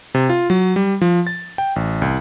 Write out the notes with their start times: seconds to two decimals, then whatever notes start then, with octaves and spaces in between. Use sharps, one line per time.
0.15 C3
0.29 F4
0.50 F#3
0.76 G3
1.01 F3
1.27 A6
1.58 G5
1.76 A1
2.02 C2